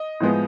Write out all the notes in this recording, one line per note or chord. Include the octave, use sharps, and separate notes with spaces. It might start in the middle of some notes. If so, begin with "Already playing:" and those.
Already playing: D#5
A2 F3 G#3 B3